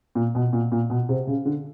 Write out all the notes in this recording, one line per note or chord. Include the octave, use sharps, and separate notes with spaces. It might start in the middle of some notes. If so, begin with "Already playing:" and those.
A#2
B2
A#2
A#2
B2
C3
C#3
D3